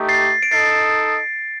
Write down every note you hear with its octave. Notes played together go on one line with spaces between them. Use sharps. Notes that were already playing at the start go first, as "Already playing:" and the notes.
Already playing: A3 D#4 G4
A6 C7
D7
D#4 A4 D#5 A6 C7